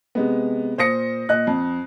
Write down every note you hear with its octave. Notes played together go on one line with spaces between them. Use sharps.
C3 G#3 B3
A#2 C5 D#6 A#6 C#7
A#2 D#5 F#6
F2